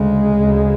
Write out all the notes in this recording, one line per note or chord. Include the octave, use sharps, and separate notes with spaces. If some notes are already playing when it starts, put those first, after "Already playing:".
Already playing: D2 C#3 G#3
D2 C#3